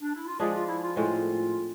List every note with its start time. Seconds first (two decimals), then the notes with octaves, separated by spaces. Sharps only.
0.02 D4
0.15 E4
0.27 F4
0.39 F3 G#3 D4 G#4
0.54 F4
0.68 E4
0.83 F4
0.96 A2 G#3 C4 F4